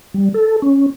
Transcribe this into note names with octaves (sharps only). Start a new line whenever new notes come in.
G3
A4
C#4